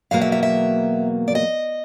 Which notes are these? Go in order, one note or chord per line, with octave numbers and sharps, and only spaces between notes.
E2 B2 F#3 A#3 F5
E5
E5
E5
D5
D#5